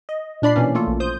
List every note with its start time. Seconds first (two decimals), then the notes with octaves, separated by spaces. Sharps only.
0.09 D#5
0.42 A#2 D4 D5 B5 C7
0.56 B2 E3 A#3 C#4
0.74 E3 A3 A#3 F4 A4
0.87 A#1
1.00 C5 D#6 G6